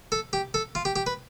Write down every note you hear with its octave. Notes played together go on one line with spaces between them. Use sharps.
A4
G4
A4
F4
G4
G4
B4